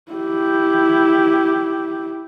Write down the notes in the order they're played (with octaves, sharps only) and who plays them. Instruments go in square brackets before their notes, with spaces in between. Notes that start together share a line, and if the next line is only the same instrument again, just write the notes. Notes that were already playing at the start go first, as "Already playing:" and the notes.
[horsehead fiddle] E4 G4